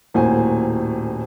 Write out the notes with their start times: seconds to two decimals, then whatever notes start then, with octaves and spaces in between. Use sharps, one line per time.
0.14 D#1 A2 A#3 F#4 C5 G#5